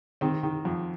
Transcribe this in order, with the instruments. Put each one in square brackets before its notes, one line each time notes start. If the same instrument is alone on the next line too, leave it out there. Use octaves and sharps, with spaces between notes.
[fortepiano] D#3 C4
D#3
F2